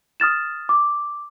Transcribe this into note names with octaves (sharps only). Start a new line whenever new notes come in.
D#6 F6 A6 E7
D6